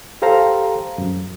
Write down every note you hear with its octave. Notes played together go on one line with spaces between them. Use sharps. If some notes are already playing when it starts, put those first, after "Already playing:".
G4 A4 C5 F5 A#5
F#2